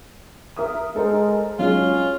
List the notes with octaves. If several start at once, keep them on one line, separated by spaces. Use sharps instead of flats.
A#4 E5 D#6
G#3 A4 A#4 C5
F#3 G#3 C#4 F4 G#4